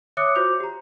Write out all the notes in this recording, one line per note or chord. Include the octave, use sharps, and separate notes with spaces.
C#5 E5 D6 D#6 F#6 C#7
F4 F#4 C5 D6 G6 F7
G4 A#5